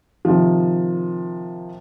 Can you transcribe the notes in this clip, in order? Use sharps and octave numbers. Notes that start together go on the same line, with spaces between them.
C3 D#3 F3